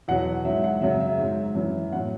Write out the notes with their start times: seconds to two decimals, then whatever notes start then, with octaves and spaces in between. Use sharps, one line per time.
0.08 E2 B2 F#3 F#5
0.45 G#2 F#3 E5
0.64 F#5
0.81 F#2 C#3 F#3 E5
1.00 E5
1.18 G#2 F#3
1.55 F#2 E3
1.92 A2 F#3 F#5